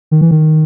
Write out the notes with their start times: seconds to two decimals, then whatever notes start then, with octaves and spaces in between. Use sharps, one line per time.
0.11 D#3
0.21 E3
0.31 D#3